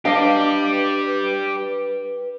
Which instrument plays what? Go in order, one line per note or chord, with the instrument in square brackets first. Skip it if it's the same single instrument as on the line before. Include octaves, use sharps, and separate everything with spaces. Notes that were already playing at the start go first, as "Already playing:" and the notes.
[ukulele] D4 D#5 F5 [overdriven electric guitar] G4 D5 [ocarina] B4